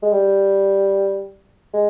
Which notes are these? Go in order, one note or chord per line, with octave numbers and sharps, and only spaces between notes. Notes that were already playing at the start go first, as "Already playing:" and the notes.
G#3
G3
G#3